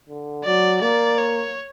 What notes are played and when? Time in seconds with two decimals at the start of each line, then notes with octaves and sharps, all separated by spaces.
0.09 D3
0.45 F#3 D5
0.81 A#3 D5
1.18 C#5